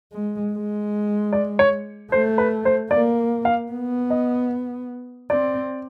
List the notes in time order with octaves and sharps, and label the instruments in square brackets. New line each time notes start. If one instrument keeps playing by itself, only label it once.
[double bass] G#3
G#3
[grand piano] D5
C#5
[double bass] A3 [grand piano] C5
[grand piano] B4
C5
[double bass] A#3 [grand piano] D5
[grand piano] F5
[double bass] B3
[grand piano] D#5
[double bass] C4 [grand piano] D5